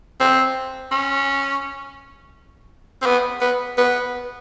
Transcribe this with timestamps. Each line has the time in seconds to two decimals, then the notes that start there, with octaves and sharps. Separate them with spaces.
0.20 C4
0.91 C#4
3.02 C4
3.06 B3
3.41 B3
3.77 B3